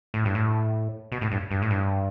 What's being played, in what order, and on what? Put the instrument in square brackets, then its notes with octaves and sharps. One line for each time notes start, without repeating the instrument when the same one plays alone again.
[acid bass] A2
G2
A2
B2
A2
G2
G2
A2
G2